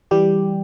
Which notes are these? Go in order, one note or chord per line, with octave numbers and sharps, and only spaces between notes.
E3 G3 G4